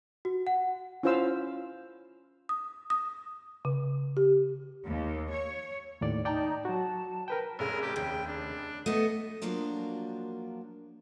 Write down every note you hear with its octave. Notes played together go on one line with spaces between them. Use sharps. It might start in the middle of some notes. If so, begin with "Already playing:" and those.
F#4
F#5
C#4 E4 F4 C5 F5 E6
D#6
D#6
C#3
G4
D#2
C#5
D#2 A2 D5
D#4 D5 G5 A5 A#5
F#3 F#4 A5
A#4 B4 G5
F1 C#3 G#4 A#4
G4
D#2 G5
D4
A3 B3 D#5
F3 F#3 A#3 D4 F4 F#4